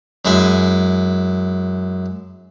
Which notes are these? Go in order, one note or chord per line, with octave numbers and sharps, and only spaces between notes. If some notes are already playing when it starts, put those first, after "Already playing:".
F#2 G#3 E4 G#5